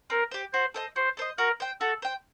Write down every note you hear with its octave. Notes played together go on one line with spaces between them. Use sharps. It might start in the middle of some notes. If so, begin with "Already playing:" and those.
C4 A#4
G4 C5
F#4 C5
A4 C5 D#5
F#4 C5
A4 C5 D#5
F#4 A#4
C5 G5
F#4 A4
C5 G5